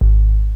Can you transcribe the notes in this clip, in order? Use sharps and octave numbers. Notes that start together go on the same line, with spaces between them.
G#1